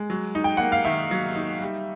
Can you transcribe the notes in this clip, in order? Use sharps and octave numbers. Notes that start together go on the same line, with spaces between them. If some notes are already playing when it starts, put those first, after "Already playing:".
Already playing: G#3
F#3
D#4
G5
A#3 F#5
F5
D#3 E5
F#3
D#4
G3